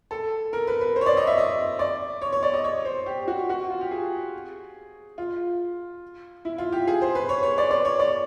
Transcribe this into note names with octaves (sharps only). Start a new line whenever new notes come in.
A4
A#4
B4
B4
C5
C#5
D5
D#5
E5
D#5
D5
C#5
C#5
D5
D#5
C#5
C5
G4
F#4
F#4
F4
G4
G#4
F4
E4
F4
G4
G#4
C5
B4
C#5
C#5
D5
D5
C#5
D5